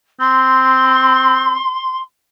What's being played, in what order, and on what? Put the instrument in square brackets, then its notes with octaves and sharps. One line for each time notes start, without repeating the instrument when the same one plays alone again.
[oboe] C4 [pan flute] C6